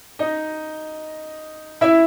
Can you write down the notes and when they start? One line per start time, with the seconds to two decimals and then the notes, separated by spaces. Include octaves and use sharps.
0.19 D#4 D#5
1.81 E4 E5